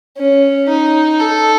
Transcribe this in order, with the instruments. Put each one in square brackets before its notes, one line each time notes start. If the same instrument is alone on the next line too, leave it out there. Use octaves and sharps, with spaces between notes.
[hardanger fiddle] C#4
D#4
A4